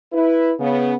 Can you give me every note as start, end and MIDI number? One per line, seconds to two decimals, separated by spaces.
0.13 0.53 64
0.13 0.53 71
0.59 0.94 49
0.59 0.94 59